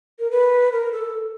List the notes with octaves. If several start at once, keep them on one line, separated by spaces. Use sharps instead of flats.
A#4
B4
A#4
A4